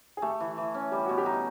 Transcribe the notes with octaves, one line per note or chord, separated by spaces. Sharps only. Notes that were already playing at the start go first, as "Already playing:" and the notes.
G#4
A3 G4
E3
E3
C#4
G3 G4
B2 F#4
G4
D#4